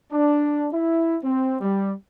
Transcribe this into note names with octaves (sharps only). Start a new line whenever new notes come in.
D4
E4
C4
G3